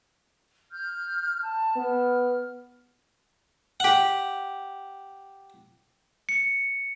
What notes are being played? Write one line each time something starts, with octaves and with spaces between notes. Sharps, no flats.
F6 G6
A5
B3 F6
G4 F#5
C#7